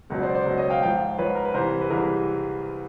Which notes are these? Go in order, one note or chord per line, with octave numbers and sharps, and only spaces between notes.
C#2 B2 F#3
C5 D5
C5 D5
C#2 B2 F#3
C#5 D#5
F5 G5
G#2 F3 F5 G5
G#2 F3 B4 C#5
A#4
B4
C2 C3 E3 A#4 C5
B4
C2 C3 E3 G#4 A#4